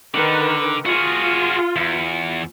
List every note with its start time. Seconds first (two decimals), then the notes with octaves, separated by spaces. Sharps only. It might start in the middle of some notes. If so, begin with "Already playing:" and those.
0.14 D3 D#3 A#4 B4
0.85 F4 F#4 G#4
1.76 E2